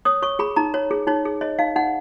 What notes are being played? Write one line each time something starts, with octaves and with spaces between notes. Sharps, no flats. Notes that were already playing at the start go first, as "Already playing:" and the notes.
C#5 D#6
C#5 C#6
G#4 B5
D#4 A#5
C#5
G#4
D#4 C#5
G#4
C#5 D#5
D#4 F5
D#4 F#5